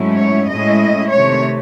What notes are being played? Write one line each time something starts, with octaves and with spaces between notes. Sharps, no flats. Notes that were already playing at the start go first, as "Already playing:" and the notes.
Already playing: G#2 F#3 A3 C#4 E4
C#5
A2 G#3 C#4 E4 D#5
C3 D#3 A3 C#5